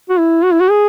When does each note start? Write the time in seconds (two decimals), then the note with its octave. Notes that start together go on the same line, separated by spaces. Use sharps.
0.10 F#4
0.19 E4
0.44 F#4
0.53 E4
0.61 F#4
0.70 G#4